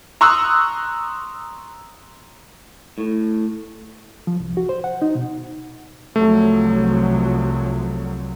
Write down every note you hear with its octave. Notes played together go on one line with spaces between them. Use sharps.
A#5 C6 C#6 D#6 E6 F#6
A2
F3
C2
F#4
C5
F#5
D#4
B2
C2 F3 F#3 A3